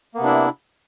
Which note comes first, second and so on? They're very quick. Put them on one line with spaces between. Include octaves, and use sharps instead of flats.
A#3 B3 C3 D4 E4